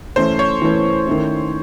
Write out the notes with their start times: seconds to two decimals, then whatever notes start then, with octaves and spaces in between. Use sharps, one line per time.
0.16 E3 A3 C#4 C5
0.39 C#5
0.62 E3 A3 C#4
1.07 D#3 A3 C#4 E4